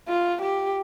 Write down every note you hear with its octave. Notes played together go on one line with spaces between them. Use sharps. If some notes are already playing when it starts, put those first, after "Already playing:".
F4
G4